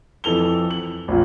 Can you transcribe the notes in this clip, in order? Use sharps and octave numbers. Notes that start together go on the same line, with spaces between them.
F2 E3 A4 F7 G7
F#7
A#1 A#2